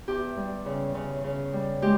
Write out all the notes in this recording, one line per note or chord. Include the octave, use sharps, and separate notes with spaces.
E2 G4
G3
C#3
C#3
C#3
G3
G#3 G4